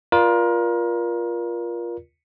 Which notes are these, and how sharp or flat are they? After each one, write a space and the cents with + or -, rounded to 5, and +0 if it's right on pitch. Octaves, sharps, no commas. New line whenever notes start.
F4 -5 A#4 +30 D5 +0